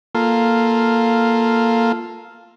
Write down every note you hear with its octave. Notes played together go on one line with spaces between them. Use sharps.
A#3 F4 A4